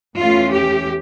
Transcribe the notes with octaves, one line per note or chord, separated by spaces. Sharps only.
E2 E3 A3 C#4 F4
G4